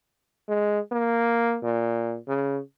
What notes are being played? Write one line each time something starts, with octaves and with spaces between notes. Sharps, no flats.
G#3
A#3
A#2
C#3